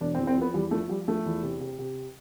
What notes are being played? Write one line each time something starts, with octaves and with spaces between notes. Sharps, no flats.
E1 D4
C4
E2
C4
F3 B3
E2 G3
F3 A3
F3 G3
F3 A3
E2
C3
C3
C3